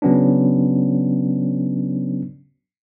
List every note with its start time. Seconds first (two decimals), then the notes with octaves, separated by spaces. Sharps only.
0.02 C#3 F#3 B3 C#4 D4